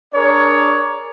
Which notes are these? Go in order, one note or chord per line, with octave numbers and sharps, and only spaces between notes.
D4 G#4 A#4 C#5 D5